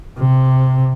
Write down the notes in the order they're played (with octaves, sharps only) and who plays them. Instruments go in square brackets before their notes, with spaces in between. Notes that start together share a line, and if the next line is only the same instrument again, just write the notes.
[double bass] C3